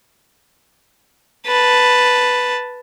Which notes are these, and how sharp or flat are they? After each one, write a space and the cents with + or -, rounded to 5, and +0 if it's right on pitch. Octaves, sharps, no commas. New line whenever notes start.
B4 +0 A5 +0